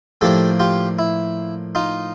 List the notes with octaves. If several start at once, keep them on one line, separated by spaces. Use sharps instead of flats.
A2 F3 A#3 D4 G4 A4
F4 G4
E4
D#4 F4